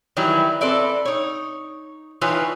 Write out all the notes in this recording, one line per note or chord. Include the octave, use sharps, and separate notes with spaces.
D#3 E3 F#3 G3 E4
C4 A4 B4 D5 E5
D#4 C#5
E3 D#4 F4 B4 C#5